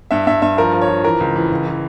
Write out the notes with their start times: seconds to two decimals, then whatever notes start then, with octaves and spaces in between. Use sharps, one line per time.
0.11 G2 E5
0.27 G2 E5
0.42 G2 E5
0.57 F3 A#4
0.73 F3
0.82 C#5
0.89 F3
1.04 E3 A#4
1.20 C#2
1.36 E3
1.51 C#2
1.66 E3